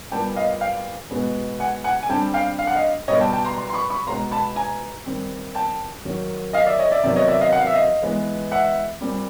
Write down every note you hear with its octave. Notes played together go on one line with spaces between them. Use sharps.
A#2 G3 B3 G5 A5
D#5 F5
F5 G5
B2 G#3 B3
F#5 G#5
F#5 G#5
G#5
D3 G3 C4 G5 A5
F5 G5
F5
F#5
D#5 F5
B2 G3 B3 C#5 D#5
G5 A5
G5 A5
A#5 C6
A#5 C6
C6
B5 C#6
B5 C#6
B2 G#3 B3 A#5 C6
A5 B5
G#5 A#5
D#3 G3 C4
G5 A5
D#3 F#3 A#3
D#5 F5
D5 E5
C#5 D#5
D5 E5
C3 D#3 F#3 B3 D5 E5
C#5 D#5
D5 E5
D#5 F5
F#5
F5
E5
D#5 F5
E3 G#3 B3
E5 F#5
A#2 G3 C4